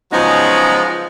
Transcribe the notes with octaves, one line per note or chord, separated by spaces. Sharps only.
C#3 F3 F#3 G#3 B3 D#4